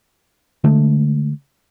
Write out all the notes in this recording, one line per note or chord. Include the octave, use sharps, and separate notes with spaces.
D3 G#3 A3